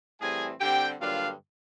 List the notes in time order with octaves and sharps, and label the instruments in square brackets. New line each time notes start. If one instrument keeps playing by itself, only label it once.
[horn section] A2 E3 G3 C4 G#4 G#5
D3 G3 C4 G4 G5
G2 D3 F#3 A#3 D4 F4 F5